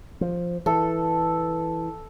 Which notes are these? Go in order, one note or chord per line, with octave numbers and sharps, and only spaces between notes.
F3
E3 A4